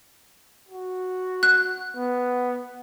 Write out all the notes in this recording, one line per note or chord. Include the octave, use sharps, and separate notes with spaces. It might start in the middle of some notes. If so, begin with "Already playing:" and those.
F#4
F#6
B3